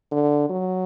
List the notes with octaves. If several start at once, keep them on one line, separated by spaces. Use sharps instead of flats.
D3
F#3